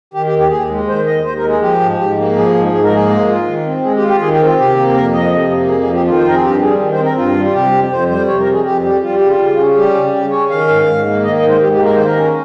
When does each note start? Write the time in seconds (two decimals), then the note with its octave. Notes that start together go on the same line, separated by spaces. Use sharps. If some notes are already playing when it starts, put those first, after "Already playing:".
0.14 D#3 G4
0.26 G4
0.32 D#2
0.39 G4
0.50 D#2 G#4
0.69 G#3
0.88 D#3 C5
1.06 D#2 D#5
1.25 D#2 C5
1.37 A#4
1.43 G#3
1.49 G#4
1.61 F3 G4
1.80 G#2
1.99 G#2 G4
2.17 A#3
2.36 F3 G#4
2.54 G#2
2.72 G#2 G#4
2.84 A#4
2.91 A#3 G#4
3.09 G#3
3.28 F4
3.47 D#3
3.65 C4
3.84 G#3 G#4
3.96 G4
4.02 F4
4.08 G4
4.21 D#3 G#4
4.33 G4
4.40 C4
4.45 F4
4.58 C3 G4
4.76 A#3
4.94 F2 A#4
5.13 F3 D#5
5.32 C3
5.50 A#3
5.68 F2 G#4
5.81 G#4
5.87 F3
5.93 G4
6.06 D#3 F4
6.17 C5
6.25 C4 A#4
6.34 G#4
6.42 G2 G4
6.61 G3 G#4
6.79 D#3
6.92 C5
6.98 C4
7.05 A#4
7.17 G2 F4
7.36 G3
7.45 F4
7.54 C3 G4
7.72 F2
7.91 F2 C5
8.09 G3 C5
8.27 C3 C#5
8.40 A#4
8.47 F2
8.52 G#4
8.64 F2 G4
8.83 G3 G4
9.02 G3 F4
9.15 G4
9.20 C#3
9.28 F4
9.38 C#3
9.57 C#4
9.76 G3 G4
9.95 C#3
10.12 C#3 G4
10.31 C#4 C#5
10.50 D#3 F5
10.68 G#2
10.86 G#2
11.05 A#3
11.24 D#3 D#5
11.36 D#5
11.42 G#2
11.48 C5
11.61 G#2 G4
11.72 G4
11.79 A#3
11.85 A#4
11.95 D#3 C5
12.06 A#4
12.16 C#4